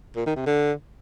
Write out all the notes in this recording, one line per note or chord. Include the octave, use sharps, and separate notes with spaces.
A#2
D#3
C3
D3